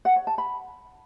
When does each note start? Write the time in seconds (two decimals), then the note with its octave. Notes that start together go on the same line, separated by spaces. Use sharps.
0.05 F#5
0.16 C#5
0.27 A5
0.38 B5